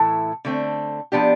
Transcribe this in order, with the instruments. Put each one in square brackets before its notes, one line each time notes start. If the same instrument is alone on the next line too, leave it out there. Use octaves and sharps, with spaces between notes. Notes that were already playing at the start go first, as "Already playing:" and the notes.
Already playing: [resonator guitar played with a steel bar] A2 E3 A3 E4 A4
D3 A3 C4
F3 B3 D4 G4